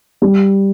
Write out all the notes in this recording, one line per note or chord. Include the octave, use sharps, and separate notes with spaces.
G3